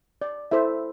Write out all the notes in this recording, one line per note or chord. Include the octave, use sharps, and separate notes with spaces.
D5
E4 A4 C5 E5